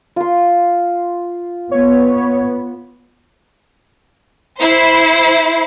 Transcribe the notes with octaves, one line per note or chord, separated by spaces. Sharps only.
F4 C6
B3 C#5
E4 C5 C7